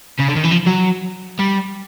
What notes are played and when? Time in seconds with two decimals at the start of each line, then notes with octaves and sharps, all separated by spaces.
0.19 C#3
0.28 D3
0.35 D#3
0.44 E3
0.51 F3
0.66 F#3
1.39 G3